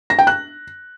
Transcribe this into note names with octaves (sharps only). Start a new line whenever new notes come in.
A#6
G5
F#6